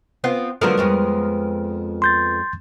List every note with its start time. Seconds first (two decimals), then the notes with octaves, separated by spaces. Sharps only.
0.24 B3 C4 F4
0.61 D3 F3 F#3 A3 B3 A#4
0.78 F2 G#3 C#5
2.02 C6 G6 A6